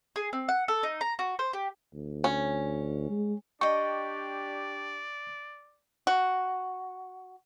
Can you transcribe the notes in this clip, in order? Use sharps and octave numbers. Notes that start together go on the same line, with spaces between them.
G#4
C4
F#5
A4
D#4
A#5
F#4
C5
G4
D2
C#4
G#3
D4 G4 D5 D#5 G5 C#6
F#4